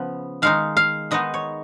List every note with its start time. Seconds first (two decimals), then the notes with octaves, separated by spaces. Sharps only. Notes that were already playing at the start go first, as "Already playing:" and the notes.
Already playing: C#3 F3 B3
0.42 D#3 G#3 D#4 F5
0.77 F5
1.11 D#3 G#3 B3 D#4 D#5
1.34 C#5